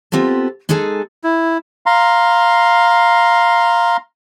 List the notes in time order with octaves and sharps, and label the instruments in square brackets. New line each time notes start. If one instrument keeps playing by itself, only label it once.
[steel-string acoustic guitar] B3 C4 F4 G4 A4
G#3 D#4 G#4 A4 G#5
[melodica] E4
[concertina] F5 A#5 C6